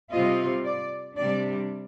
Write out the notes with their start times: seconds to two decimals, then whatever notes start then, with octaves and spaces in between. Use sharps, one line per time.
0.12 C3 G3 C4 F4 D#5
0.65 D5
1.16 C3 G3 D4 D5